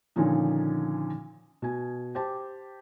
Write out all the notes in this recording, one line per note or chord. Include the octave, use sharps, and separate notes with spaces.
A#2 D3 D#3 F3 C#4 D#4
B2 G#5
G4 C5 A5